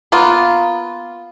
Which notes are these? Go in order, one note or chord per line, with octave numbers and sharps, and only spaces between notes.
A#3 B3 F4